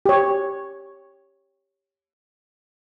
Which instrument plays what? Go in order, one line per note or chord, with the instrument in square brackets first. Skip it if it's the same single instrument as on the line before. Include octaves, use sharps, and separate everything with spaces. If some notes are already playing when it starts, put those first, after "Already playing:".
[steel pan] G4 C#5